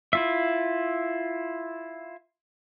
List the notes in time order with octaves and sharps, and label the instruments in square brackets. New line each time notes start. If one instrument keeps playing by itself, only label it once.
[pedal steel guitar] E4 F4 E5